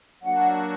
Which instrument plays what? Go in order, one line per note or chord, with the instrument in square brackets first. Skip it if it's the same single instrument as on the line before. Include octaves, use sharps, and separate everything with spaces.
[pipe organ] F#3 A#3 D4 F#4 [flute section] F#5